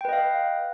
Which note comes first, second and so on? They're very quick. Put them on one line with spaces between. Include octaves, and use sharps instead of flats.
G5 B4 D#5 F5